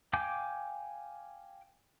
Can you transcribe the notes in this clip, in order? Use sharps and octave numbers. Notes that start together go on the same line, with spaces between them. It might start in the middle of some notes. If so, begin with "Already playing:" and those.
F5 G5 G#5 D6 G6